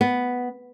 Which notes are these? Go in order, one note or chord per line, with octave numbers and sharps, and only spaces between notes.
B3